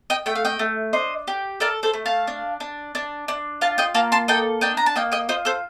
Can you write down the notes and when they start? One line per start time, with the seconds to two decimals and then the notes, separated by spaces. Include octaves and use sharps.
0.10 D#5 G5
0.26 A3 G5
0.35 F5
0.45 D#5 G5
0.59 A3
0.93 D4 C5 D#5
1.28 G4
1.60 A4 A#4 D5
1.83 A4 C5
1.94 A3
2.06 F5 A5
2.27 D4
2.60 D4
2.95 D4
3.28 D4
3.61 F4 F5 A5
3.78 D#5 G5
3.95 A#3 F5 A5
4.12 A5 C6
4.28 A4 D#5 G5
4.61 D4 D#5 G5
4.77 A#5
4.86 A5
4.96 A#3 D#5 G5
5.12 D#5 G5
5.29 F4 C5 D#5
5.45 A4 C5